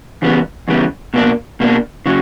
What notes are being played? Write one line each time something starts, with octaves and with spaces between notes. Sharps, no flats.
E2 C#3 G3 B3
E2 C#3 G3 B3
B2 A#3 D4
B2 A#3 D4
C#3 F#3